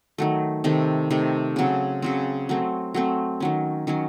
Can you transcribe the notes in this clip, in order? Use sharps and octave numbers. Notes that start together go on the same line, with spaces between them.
D#3 F#3 A3
C3 D#3 A3
C3 D#3 A3
C#3 F#3 C4
C#3 F#3 C4
F#3 A3 C4
F#3 A3 C4
D#3 F#3 C#4
D#3 F#3 C#4